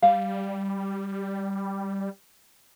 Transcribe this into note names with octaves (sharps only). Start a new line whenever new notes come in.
G3 F5